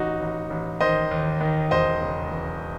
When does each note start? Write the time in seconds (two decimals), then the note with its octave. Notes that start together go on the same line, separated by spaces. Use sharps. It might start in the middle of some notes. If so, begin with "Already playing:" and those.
Already playing: A1 D#4 F#4
0.20 A1
0.50 A1
0.81 D#3 C5 D#5
1.11 D#2
1.41 D#3
1.71 E1 C5 D#5
2.01 C#3
2.31 E3